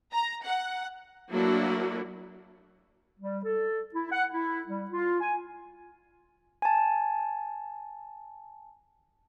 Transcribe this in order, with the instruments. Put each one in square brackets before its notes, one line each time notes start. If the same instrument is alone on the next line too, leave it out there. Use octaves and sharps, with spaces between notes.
[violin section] A#5
F#5
[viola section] F#3 A3 A#3 D4 E4 F#4
[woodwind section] G3
A4
E4
F#5
E4
G3
F4
G#5
[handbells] G#5 A5